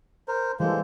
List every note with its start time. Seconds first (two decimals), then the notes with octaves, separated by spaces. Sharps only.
0.28 A#4 C5
0.60 E3 G3 G#3 A#3 A4 C5